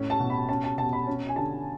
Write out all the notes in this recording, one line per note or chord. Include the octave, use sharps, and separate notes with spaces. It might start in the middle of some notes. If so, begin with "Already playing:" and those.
Already playing: A2 C#4
A5
B2
B5
C#4 A5
A5
B2 A5
B5
C#4
G#5
D3 A5